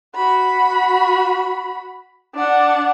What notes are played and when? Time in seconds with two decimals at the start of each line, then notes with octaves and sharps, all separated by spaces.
0.15 F#4 B5
2.35 D4 F#5